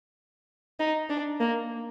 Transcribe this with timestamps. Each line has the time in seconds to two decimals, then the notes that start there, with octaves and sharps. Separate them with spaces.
0.80 D#4
1.10 D4
1.40 A#3